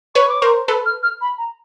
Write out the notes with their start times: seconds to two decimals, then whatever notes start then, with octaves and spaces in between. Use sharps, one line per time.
0.15 B4 C#5 C#6
0.29 D6
0.41 A#4 C5 C#6
0.68 A4 B4
0.86 F6
1.03 F6
1.21 B5
1.38 A#5